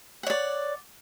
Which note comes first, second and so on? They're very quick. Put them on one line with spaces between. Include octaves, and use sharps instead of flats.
F#5 C#5 D5